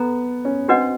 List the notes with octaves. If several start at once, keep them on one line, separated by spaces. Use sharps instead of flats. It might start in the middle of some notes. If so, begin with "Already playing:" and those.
Already playing: B3 A4 A#5
C#4
C4 D4 F#4 B4 D#5 F#5